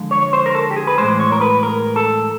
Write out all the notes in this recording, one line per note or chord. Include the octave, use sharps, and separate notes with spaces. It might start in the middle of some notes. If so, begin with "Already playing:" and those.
Already playing: D3 F3 G#3
C#5
C5
A#4
A4
G4
G#4
B4
A2 E3 G#3 C5
C#5
A#4
B4
A#4
A4